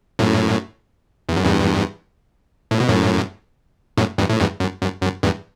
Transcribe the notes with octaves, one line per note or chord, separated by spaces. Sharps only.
F#2 A2
E2
F#2
E2 G2
A2
B2
F#2 A2
F#2 A2
E2 G2
A2
E2 G2
F#2
F#2
F#2
E2 G2